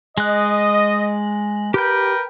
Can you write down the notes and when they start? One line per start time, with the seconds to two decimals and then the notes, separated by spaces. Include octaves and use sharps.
0.18 G#3 D#5 F#6
1.74 G4 A#4 B4 G5 G6